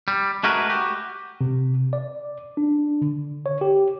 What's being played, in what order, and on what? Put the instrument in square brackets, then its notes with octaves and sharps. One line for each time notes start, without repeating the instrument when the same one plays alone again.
[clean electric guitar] G3
G#3 A3 F#4 G#4 A#4 B4
F#4 G4
[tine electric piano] C3
D5
D4
D3
C#5
G4